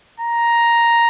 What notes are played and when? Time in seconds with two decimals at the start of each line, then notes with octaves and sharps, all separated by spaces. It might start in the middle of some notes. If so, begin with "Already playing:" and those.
0.20 A#5